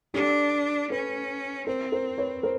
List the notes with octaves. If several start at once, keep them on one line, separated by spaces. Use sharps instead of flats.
D4 G4 A4
C#4 A4 B4
C4 A#4 C5
A#4 C5
B4 C#5
A#4 C5